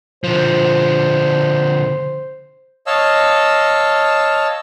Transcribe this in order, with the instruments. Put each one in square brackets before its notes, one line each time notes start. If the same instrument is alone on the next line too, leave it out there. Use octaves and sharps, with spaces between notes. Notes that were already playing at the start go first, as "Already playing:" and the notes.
[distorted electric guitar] D3 F3 [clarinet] C5
[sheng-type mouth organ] C#5 D#5 F5 A5 E6